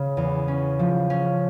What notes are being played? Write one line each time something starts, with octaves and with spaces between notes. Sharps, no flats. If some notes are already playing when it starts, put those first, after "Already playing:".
Already playing: C#3
E2
C#4
F3
C#4